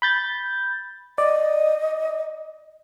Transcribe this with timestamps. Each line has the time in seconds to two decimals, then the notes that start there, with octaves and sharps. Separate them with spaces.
0.02 B5 G6 A6
1.18 D5 D#5